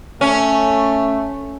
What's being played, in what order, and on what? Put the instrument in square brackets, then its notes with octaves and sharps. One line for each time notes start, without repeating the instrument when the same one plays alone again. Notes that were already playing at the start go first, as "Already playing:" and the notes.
[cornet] A3 [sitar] C#4